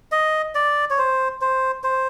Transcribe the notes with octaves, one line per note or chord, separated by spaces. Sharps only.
D#5
D5
C#5
C5
C5
C5